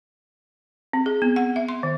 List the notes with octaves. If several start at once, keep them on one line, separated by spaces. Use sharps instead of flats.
C4
G#4
B3
F#5
E5
C6
D#3